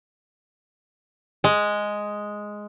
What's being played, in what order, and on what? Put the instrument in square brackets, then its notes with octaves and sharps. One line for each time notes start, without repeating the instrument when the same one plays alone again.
[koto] G#3